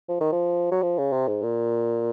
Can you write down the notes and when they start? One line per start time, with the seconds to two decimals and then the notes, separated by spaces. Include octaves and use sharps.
0.09 F3
0.21 D#3
0.32 F3
0.71 F#3
0.82 F3
0.98 C#3
1.13 C3
1.28 G#2
1.43 A#2